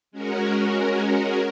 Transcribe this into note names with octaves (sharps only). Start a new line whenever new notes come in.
G#3 C#4 F#4 A#4